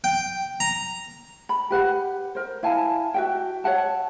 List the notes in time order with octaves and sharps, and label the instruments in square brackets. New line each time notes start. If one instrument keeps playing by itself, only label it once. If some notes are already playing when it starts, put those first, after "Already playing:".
[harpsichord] G5
A#5
[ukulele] B5
G4 B4 F#5
A#4 C5
E4 F5 G#5 A5
F#4 E5 G5
C#5 E5 F#5 A5